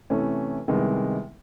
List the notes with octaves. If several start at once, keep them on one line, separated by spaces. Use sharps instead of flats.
C3 E3 A3 C#4
C2 C3 D#3 G#3 B3